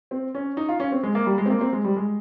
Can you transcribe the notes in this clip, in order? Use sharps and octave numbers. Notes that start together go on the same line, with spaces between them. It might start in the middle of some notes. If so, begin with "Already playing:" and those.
C4
C#4
D#4
F4
C#4
C4
G#3
A#3
G3
G#3
C4
A#3
C4
G#3
G3
G#3